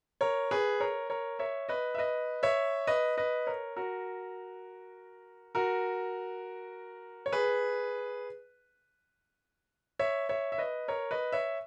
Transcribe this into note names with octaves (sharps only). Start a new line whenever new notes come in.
A#4 C#5
G#4 B4
A#4 C#5
A#4 C#5
C#5 E5
B4 D#5
E5
B4 D#5
C#5 E5
B4 D#5
B4 D#5
A#4 C#5
F#4 A#4
F#4 A#4
C#5
G#4 B4
C#5 E5
C#5 E5
E5
B4 D#5
A#4 C#5
B4 D#5
C#5 E5